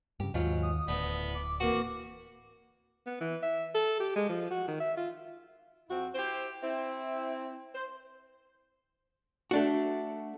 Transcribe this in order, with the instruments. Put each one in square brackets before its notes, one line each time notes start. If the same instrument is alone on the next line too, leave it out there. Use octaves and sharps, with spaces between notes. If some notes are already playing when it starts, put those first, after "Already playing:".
[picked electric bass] G2 C#3 [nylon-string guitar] G4
[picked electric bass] D#2 [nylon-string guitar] G#2 F#3 F4
[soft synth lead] D#6
[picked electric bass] D1 [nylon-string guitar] D2 A2 [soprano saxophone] B3
[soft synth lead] D6
[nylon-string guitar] E3 A#3 C4 [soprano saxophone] F#4
[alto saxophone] B3
E3
E5
A4
G4
G#3
F3
F#4
D#3
E5
F4
[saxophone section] F2 C4 E4 F#4
E4 G4 C5
C4 E4
C5
[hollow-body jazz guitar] A3 D4 F#4